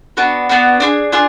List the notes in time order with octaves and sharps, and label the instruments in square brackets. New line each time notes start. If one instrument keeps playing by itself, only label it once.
[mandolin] B3 D4 F#4 B4
B3 D4 F#4 B4
D4 F4 G#4
D4 F4 G#4